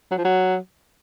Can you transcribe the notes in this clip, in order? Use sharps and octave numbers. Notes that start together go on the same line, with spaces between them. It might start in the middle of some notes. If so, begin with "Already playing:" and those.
F#3
F3
F#3